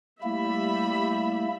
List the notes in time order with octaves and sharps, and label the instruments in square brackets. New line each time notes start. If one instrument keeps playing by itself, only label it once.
[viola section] G3 E5 B5 [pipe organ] A3 A#3 E4